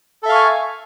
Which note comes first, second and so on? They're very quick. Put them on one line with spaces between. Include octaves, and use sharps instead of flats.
A4 E5 F5 C#6 G#5